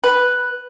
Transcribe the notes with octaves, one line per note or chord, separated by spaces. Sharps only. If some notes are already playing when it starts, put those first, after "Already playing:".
B4